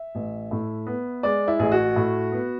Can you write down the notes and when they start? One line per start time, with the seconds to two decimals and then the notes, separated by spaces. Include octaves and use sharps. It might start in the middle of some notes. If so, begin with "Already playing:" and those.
Already playing: E5
0.15 A1
0.51 A2
0.87 B3
1.23 G#3 D5
1.48 E4
1.59 A1 G#4
1.72 F#4
1.96 A2
2.32 B3